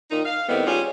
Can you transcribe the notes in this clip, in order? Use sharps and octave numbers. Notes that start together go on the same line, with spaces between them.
A#2 D#3 D#4
F5
A2 D#3 G3 B3 C4
G3 C#4 D#4 F4 G#4